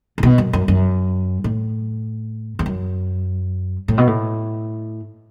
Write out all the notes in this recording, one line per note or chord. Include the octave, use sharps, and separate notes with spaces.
A2
B2
F#2
F#2
F#2
A2
E2
F#2
A2
B2
A2